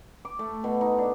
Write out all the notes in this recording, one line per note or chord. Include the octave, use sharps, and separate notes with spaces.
D6
A3
B2
D#4
D4